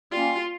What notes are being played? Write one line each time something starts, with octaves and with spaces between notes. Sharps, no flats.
G3 A#3 C#4 F4